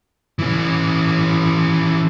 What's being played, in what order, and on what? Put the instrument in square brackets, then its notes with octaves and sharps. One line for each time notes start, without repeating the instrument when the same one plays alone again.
[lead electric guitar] E3 C#4